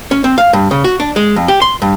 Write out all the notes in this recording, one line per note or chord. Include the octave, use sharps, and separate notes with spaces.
C#4
C4
F5
G2
C#3
F#4
D4
G#3
F2
G4
C6
G2